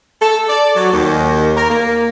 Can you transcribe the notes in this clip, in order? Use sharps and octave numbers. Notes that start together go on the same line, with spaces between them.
A4
D5
F#3
D#2
A#4
A#3